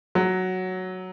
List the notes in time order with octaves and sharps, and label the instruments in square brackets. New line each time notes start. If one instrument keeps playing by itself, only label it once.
[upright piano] F#3